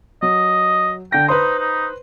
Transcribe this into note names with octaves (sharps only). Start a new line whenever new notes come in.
F#3 D#5
D3 G5 A#6
D#4 B4 C5 C6
D#4